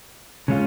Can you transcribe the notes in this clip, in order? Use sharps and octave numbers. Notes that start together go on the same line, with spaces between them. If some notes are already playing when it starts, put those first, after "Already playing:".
C#3 G#3 C#4 F4